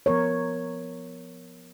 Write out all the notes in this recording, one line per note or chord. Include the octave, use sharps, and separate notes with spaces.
F3 B3 A#4 C#5